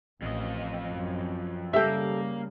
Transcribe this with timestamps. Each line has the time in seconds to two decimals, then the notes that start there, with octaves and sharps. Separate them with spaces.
0.22 A1 F2 D#5
0.87 F#2
1.73 C#3 G3 A#3 G4 A4 E5 G5